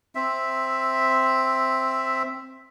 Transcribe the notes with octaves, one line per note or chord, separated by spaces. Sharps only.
C4 E5